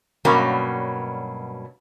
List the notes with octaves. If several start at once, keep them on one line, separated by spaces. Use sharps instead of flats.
G2 B2 F#3 G3 A#3 C#4